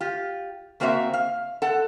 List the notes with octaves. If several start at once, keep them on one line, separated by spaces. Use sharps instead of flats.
F4 G4
C#3 A#3 C4 F#4 C#5 E5
F5
A4 F#5